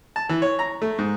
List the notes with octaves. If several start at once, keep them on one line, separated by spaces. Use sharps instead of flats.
A5
E3
C#5
A#5
A3
G#2